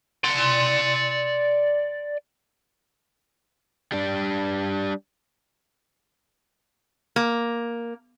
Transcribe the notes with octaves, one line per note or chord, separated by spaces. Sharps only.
D5 C6
G3 D4
A#3